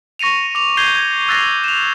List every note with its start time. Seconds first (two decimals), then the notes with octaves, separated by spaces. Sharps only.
0.19 C#6 A#6 C#7 D#7 F7
0.55 D6 F7
0.77 G6 G#6 C7 D#7 F7 G7
0.96 G#6
1.28 E6 F#6 A6 A#6 C7 F7
1.64 E7 F7